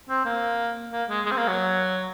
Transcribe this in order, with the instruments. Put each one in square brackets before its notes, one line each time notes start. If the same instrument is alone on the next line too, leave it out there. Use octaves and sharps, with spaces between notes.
[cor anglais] C4
A#3
A#3
G#3
G#3
C4
A#3
F#3